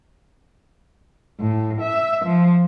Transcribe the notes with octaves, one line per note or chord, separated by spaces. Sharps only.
A2
E5
F3